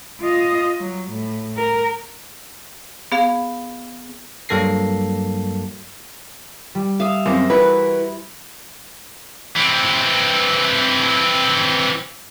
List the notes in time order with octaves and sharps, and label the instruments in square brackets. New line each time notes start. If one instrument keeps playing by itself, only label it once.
[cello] F4 D#5
F#3
A2
A#4
[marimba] B3 G#4 F5
[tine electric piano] G2 F#3 A#3 A4 A#6 C7
[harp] G3
[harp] E5 D#6 E6 [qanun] F5
[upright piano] F#2 C4 [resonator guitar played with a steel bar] A#3 [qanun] C5
[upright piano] E3 F#4 A#4 [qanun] E4 [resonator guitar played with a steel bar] B4
[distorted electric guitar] E3 C4